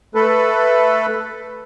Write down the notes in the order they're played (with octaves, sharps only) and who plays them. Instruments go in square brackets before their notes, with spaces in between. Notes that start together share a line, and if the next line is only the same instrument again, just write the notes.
[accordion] A3 A4 B4